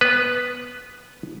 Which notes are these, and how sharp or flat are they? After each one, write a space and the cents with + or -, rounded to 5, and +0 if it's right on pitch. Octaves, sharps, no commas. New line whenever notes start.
B3 +0 B4 +0